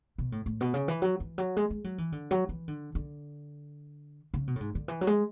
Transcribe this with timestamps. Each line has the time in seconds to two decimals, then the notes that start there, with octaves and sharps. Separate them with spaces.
0.18 B2
0.32 A2
0.46 A2
0.61 B2
0.74 C#3
0.88 E3
1.02 F#3
1.20 E3
1.38 F#3
1.57 G#3
1.70 G#3
1.84 F#3
1.98 E3
2.12 D3
2.31 F#3
2.49 E3
2.68 D3
2.95 D3
4.34 C#3
4.47 B2
4.56 A2
4.60 G#2
4.75 D3
4.88 E3
5.01 F#3
5.07 G#3